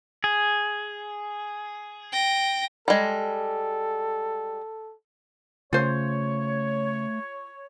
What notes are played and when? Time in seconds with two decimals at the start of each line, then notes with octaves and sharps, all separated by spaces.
0.24 G#4
2.12 G5 A#6
2.88 G3 G#3 A4
5.73 C#3 A3 F4 C5 C#5